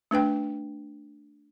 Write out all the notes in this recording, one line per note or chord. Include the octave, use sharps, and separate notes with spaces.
A3 D4 B4 G5